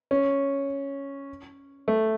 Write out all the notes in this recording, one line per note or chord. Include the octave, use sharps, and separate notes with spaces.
C#4
A3